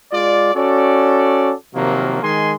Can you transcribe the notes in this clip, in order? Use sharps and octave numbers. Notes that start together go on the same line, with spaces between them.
G#3 F4 D5
C#4 F#4 A4 D5
C3 D#3 F3 F#3 A#3
D#3 G#3 G#5 C6